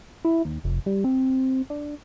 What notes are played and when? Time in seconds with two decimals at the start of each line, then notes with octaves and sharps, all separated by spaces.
0.25 E4
0.45 D#2
0.64 F1
0.86 G3
1.04 C4
1.70 D4